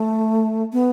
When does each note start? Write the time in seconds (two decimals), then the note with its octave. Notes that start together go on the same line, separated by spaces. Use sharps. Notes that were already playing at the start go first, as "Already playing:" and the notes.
Already playing: A3
0.73 B3